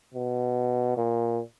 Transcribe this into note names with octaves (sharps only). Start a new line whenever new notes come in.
B2
A#2